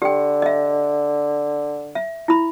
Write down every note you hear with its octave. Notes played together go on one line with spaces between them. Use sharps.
D3 G4 G5
D#5 E5
E5
E4 B5